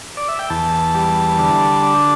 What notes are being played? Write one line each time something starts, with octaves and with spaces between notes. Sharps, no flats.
D5
E5
G5
E2 A5
G3
D3
D4